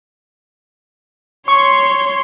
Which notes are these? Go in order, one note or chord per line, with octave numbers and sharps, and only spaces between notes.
C#5 C6 C#6